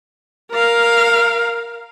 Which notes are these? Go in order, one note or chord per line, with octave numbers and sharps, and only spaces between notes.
A#4 F5